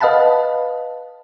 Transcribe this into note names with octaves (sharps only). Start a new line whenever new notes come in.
B4 D#5 F5 F#5 A5 B5